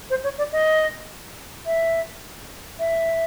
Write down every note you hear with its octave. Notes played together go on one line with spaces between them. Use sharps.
C5
C#5
D5
D#5
E5
E5